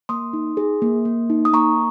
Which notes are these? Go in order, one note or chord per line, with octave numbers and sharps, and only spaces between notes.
A#3 C6 D#6
D#4
G#4
A#3
A#3
D#4
D#6
A#3 A#5 C#6